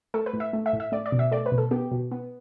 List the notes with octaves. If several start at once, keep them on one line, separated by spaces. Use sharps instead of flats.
A3 A4
B4
A2
E5
A3
E5
A2
E5
A3 D5
D5
B2
E5
A3 D5
B4
B2
A4
B3 G4
B2
B3